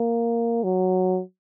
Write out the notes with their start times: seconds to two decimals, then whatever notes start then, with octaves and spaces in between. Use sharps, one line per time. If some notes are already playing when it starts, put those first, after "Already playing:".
Already playing: A#3
0.64 F#3